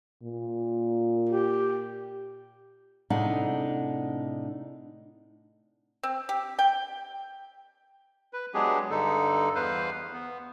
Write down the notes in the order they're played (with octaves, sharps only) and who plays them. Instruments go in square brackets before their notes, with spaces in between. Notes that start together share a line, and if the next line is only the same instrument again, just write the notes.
[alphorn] A#2
[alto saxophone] G4
[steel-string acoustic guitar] A2 C3 D4 D#4 G#4 F#5
[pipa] C4
G4
G5
[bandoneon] B4
F#3 G#3 B3 D4 G4 G#4
G2 D3 D#4 A4
E2 B4 C5 F5
B3